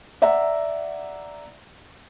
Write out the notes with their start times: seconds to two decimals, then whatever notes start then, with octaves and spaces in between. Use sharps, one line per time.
0.22 D5 E5 F#5 A#5